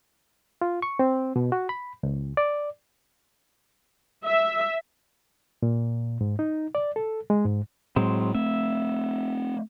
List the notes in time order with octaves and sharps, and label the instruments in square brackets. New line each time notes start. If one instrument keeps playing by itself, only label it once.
[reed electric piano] F4
C#6
C4
B2
F#4
B5
C#2
D5
[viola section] E5
[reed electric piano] A#2
G#2
D#4
D5
A4
G#3
G#2
[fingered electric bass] A2 [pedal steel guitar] F#3 G#3 C4
[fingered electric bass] A3 C4 [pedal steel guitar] E5